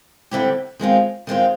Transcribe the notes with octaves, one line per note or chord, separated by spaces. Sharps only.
D3 G3 C4 E4 G4
D#3 G#3 C4 F4
D#3 G#3 C4 F4